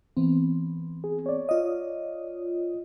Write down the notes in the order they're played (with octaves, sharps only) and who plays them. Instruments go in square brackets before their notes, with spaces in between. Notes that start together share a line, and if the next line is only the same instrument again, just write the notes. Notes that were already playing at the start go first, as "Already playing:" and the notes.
[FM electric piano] E3 B3 C4
[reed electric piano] G#4
C#5 D5
[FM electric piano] F4 D#5